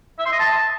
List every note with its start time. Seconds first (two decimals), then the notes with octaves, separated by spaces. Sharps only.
0.19 E5
0.25 C6
0.32 D#5
0.39 A5